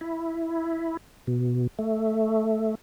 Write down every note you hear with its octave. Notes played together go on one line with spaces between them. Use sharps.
E4
B2
A3